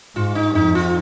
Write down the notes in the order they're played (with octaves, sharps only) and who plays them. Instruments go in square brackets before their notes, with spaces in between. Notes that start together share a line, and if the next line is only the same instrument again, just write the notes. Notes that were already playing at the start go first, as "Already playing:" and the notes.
[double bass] G#2 [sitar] F4
[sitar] D#4
[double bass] F2 [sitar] D#4
[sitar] F4